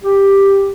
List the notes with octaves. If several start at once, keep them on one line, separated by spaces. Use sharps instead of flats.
G4